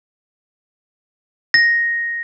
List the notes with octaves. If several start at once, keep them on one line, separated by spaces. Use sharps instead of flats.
A#6